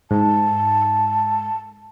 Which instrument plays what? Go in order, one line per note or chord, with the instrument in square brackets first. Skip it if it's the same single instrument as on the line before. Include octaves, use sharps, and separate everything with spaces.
[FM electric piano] G#2 [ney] A5